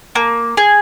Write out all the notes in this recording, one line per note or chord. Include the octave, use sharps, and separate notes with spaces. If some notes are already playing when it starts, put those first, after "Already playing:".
A#3
G#4